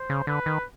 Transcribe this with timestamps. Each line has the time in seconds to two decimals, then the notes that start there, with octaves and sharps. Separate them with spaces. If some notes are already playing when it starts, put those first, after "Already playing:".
Already playing: C5
0.10 C#3
0.27 D3 B4
0.46 D#3